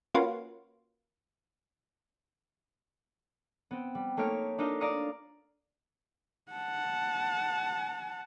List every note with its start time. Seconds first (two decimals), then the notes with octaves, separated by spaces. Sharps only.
0.14 A#3 C#4 F4 F#4 B4
3.71 B3 C4
3.95 G3
4.17 A3 A#3 D#4 C#5 F6 D7
4.58 D4 D#4 F4 A#4 D#5
4.80 D5 F5 A#5 D#6 F6 C#7
6.52 F#5 A5